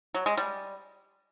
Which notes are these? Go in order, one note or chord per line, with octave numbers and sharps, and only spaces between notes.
F#3
G#3
G3